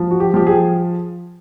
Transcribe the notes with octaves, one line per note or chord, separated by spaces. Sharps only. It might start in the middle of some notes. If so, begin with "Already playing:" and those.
Already playing: F3
F#4
G4
F3 G4
G#4